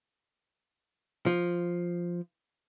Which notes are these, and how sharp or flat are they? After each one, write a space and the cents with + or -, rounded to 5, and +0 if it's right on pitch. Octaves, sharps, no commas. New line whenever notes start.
F3 +0